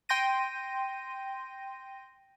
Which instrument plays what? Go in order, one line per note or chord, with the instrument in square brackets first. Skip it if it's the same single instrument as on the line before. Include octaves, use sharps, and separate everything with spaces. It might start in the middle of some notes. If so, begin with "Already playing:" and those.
[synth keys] G5 C6 G6 A#6 D#7